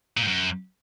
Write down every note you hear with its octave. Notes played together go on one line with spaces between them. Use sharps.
A#2
G#2
F#2